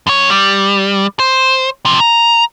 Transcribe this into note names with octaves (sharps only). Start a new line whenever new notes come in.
F#2 C#5
G3
C5
C3 F3
A#5